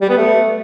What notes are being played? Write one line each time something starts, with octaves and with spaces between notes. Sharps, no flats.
G3
B3
A3